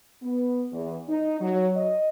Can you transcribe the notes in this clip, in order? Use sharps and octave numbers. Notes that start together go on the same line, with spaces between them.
B3
E2
D#4
F#3
D#5